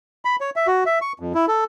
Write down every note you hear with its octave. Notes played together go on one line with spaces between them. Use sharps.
B5
C#5
E5
F#4
E5
C#6
F2
E4
A4